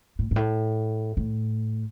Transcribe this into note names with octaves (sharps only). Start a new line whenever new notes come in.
A2
G#2
A2
A2